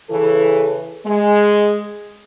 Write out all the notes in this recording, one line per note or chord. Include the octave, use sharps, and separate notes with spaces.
C#3 E3 A4
G#3